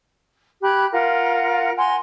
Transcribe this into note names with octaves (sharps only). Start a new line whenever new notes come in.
G4 B5 F#6 G#6
F4 A#4 F#5
F#5 G#5 A#5 C6